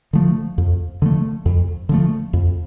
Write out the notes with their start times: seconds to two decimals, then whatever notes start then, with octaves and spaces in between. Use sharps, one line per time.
0.13 D3 F3 A3
0.58 F2
1.02 D3 F3 A3
1.46 F2
1.89 D3 F3 A3
2.33 F2